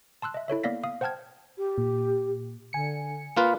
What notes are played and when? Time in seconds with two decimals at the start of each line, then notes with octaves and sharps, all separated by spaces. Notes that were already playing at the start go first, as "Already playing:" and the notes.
0.22 A5 C6 E6 F#6
0.34 D#5 E5
0.48 E4 A4 C#5 E5
0.63 A#3 B3 D5 F5 A#6 B6
0.84 F5 D#6
1.01 C5 F#5 G5 A5 F6 G#6
1.58 G4
1.78 A#2
2.73 D3 G#5 C#7
3.37 A#3 F4 B4